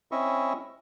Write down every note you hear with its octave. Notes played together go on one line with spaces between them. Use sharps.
C4 C#4 E4 D#5 E5 C#6